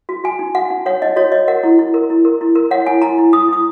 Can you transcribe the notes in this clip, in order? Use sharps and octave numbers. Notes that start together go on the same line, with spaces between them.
F#4
F#4 G#5
D#4
F#4 F#5
D#4
C#5 F#5
D#4 D#5
F#4 C#5
C#5 D#5
A#4 F#5
E4
E4
A#4
E4
A#4
E4
A#4
C#5 F#5
E4 G#5
E4 A#5
E4
E4 D#6
E4 D#6